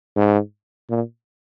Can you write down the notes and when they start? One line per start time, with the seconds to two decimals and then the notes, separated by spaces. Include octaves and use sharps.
0.16 G#2
0.90 A#2